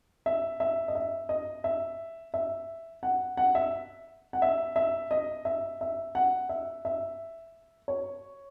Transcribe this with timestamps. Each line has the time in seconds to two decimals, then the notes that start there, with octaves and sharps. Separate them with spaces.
0.26 E5
0.60 E5
0.88 D#5
0.95 E5
1.29 D#5
1.64 E5
2.34 E5
3.03 F#5
3.37 F#5
3.55 E5
4.33 F#5
4.42 E5
4.76 E5
5.11 D#5
5.45 E5
5.81 E5
6.15 F#5
6.49 E5
6.85 E5
7.88 C#5